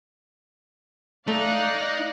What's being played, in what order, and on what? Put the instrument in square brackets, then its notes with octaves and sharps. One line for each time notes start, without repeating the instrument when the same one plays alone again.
[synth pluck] A3 [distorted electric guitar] D#4 [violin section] D5 F5 F#6